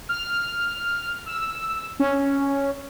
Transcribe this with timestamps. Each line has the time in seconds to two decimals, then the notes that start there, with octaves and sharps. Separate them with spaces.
0.09 F6
1.26 E6
2.00 C#4